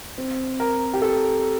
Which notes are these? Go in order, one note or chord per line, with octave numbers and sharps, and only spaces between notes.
C4
A#4
G4
A4